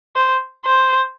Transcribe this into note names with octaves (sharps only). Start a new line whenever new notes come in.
C5
C5